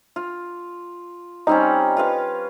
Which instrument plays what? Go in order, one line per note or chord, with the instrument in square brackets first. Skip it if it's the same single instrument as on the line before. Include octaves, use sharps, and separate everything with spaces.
[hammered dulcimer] F4
[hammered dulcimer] G3 C4 C#4 [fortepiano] D#4
[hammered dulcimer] F4 B4 F5